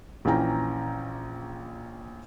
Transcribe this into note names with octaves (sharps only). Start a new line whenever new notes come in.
A#1 E3 C#4 G5 A#5